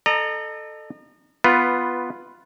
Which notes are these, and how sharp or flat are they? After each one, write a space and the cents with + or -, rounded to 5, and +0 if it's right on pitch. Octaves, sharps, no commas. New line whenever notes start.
A4 +0 D#5 -40 A#5 +0
B3 +0 F4 +0 B4 +15